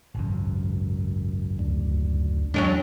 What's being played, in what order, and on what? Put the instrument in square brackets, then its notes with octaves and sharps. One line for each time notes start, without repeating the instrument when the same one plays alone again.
[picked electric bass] G#1 C#2 F#2
[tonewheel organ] D2
[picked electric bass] E2 [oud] F#3 C#4 D4